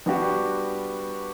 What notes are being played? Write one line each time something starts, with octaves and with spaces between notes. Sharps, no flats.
G3 B3 D4 F#4 G4